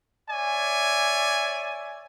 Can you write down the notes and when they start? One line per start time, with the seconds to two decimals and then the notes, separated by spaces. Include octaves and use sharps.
0.30 C#5 D5 E5 G#5